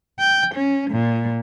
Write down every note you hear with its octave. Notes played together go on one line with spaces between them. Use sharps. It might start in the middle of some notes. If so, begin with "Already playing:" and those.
G5
C#4
A#2